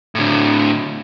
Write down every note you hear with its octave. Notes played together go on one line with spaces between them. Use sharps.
A2 D3